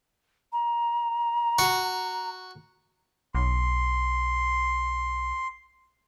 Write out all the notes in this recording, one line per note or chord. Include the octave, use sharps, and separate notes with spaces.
A#5
F#4
B1 C6